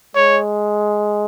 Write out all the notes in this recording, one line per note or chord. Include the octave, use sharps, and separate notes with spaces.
G#3 C#5